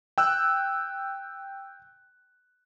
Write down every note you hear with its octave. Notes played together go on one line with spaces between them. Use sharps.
G5 E6 F#6